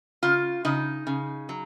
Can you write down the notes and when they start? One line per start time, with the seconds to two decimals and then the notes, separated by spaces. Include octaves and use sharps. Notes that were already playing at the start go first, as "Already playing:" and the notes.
0.23 C#3 F4
0.65 C#3 D#4
1.07 C#3
1.49 F#3